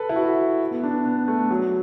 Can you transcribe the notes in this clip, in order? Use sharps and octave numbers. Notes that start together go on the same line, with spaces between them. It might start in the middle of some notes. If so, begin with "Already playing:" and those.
Already playing: A4 B4
E4
F#4
B3
D4
B3
A3
F#3